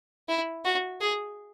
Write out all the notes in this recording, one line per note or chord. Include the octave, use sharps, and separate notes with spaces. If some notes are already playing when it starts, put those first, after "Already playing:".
E4
F#4
G#4